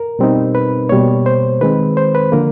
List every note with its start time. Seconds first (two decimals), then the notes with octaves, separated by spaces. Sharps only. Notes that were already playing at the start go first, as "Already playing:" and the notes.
Already playing: A#4
0.19 B2 G3 C4 D#4
0.55 B4
0.89 B2 G3 A#3 C#5
1.26 C5
1.61 D#3 G#3 C4 B4
1.97 C5
2.15 B4
2.32 D3 F3 A#3 A#4